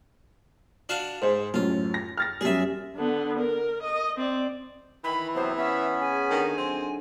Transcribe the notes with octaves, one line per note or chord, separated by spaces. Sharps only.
D4 F#4 F5
G#2 G#4 C5
F#2 A2 F4
A#6
F6 A6 A#6
F#2 G3 G#4 E5
D3 B3
A#4
D#5
C4 D5
D#3 E3 B5
C3 F#3 B3 C5
B3 C#4 E5 B5
C#3 G#5
D3 D#3 D4 D#4
F#3 C4